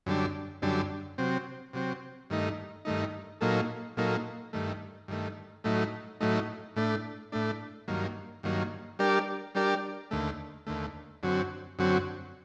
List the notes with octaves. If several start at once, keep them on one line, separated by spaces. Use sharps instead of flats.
F#2 D3 G3 D4
F#2 D3 G3 D4
C3 F#3 C4
C3 F#3 C4
G2 D#3 A3 D#4
G2 D#3 A3 D#4
A#2 F#3 A#3 D#4 A4
A#2 F#3 A#3 D#4 A4
G2 D#3 A3
G2 D#3 A3
A2 F#3 A3 D#4
A2 F#3 A3 D#4
A2 A3 D4
A2 A3 D4
G2 D#3 F#3 A#3
G2 D#3 F#3 A#3
G3 D4 G4 A#4 D5
G3 D4 G4 A#4 D5
D#2 D3 A3
D#2 D3 A3
F#2 D3 F#3 C4 F#4
F#2 D3 F#3 C4 F#4